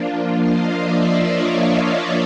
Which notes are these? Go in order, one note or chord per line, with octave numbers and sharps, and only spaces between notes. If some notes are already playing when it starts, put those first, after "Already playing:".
Already playing: F3 A#3 D4 F4
D#5 F5
D5 E5
C#5 D#5